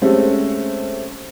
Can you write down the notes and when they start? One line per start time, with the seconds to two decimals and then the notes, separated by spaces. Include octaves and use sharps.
0.02 G#3 A3 C4 C#4 G4 A4